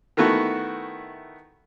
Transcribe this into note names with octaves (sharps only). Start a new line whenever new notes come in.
D#3 A3 B3 E4 F#4